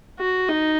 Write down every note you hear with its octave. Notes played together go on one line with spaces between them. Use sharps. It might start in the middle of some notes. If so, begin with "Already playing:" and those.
F#4
D#4